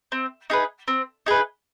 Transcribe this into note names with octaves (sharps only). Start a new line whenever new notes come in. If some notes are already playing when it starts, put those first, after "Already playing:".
C4
D#4 G#4 B4
C4
D#4 G#4 B4